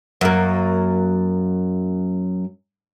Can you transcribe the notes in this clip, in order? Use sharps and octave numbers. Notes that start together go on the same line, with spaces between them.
F#2 A#3